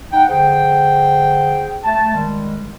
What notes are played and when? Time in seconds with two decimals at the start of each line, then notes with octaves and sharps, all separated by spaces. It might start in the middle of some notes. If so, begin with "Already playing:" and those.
0.13 D#4 F#5 G5
0.29 D3 G#4 C5 G5
1.84 A3 A5
2.13 D#3 G3 G#3